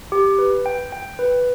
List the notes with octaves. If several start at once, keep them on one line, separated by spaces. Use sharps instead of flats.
G4
B4
G5
G5
B4